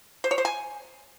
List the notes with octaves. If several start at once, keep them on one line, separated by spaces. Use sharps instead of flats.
C5
C#5
C5
G#5